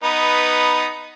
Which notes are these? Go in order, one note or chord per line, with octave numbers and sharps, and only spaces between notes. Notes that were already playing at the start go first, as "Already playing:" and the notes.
B3 D#4 B4